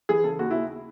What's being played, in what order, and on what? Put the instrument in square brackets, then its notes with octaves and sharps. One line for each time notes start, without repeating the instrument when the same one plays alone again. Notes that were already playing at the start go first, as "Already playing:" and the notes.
[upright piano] E3 G#4
C#3 A4
D#2 F#4
D#2 E4